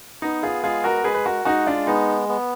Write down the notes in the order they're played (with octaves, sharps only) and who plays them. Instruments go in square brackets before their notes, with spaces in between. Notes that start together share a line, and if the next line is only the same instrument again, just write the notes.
[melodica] B3 [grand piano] D#4
[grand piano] F4 G#4
[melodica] G#3 [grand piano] F4 G#4
[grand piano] F#4 A#4
[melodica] G#3 [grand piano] G#4 B4
[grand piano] B4
F#4 A#4
[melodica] G#3 [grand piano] D#4 F#4
[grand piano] D4 F4
[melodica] B3 [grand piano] D#4
[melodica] B3